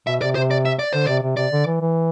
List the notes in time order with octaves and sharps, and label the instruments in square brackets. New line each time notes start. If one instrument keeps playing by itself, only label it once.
[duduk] B2 [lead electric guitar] E5
[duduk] C3 [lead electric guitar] D5
[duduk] C3 [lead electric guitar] C5
[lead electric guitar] D5
E5
D5
[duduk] D3 [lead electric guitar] C5
[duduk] C3 [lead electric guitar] D5
[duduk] C3
[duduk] C3 [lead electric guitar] D5
[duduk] D3
E3
E3